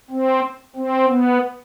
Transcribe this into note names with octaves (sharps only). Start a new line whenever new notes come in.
C4
C4
B3